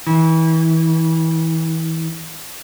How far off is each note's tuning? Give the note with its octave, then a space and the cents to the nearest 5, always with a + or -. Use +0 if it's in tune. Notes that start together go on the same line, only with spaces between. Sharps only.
E3 -30